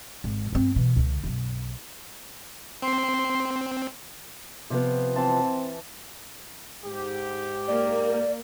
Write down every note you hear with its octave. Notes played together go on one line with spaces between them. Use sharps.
G#1
G2 C4
B2 E3
C#2 D3
B1 F#2
C4 C6
C3 F3 B3
E3 C4 A5 C6
G#2 G4
A#3 D5